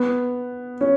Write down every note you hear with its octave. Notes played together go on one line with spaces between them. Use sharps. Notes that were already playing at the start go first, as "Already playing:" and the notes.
Already playing: B3
C#4